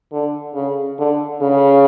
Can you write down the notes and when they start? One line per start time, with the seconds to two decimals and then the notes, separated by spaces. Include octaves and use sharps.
0.13 D3
0.55 C#3
0.99 D3
1.42 C#3